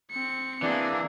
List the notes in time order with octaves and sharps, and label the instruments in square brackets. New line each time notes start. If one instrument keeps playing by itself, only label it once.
[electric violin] C4 C#7
[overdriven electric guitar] E3 [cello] A#3 G#4 [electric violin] C4 [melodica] D4 D5